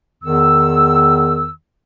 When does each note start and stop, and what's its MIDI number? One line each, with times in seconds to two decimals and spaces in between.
0.24 1.50 40
0.24 1.50 51
0.24 1.50 88